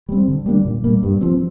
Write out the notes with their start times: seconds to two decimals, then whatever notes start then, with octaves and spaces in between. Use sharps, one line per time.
0.09 G3 C4
0.28 D3
0.46 G3 A#3 D4
0.65 A#2
0.84 G3 A#3
1.03 G2
1.21 F3 C4